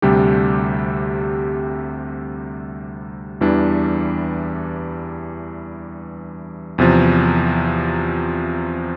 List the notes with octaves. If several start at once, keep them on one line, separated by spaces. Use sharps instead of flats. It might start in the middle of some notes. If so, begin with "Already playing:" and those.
D2 C3 G3 D4 G4
E2 E3 G3 D4
E2 C3 F3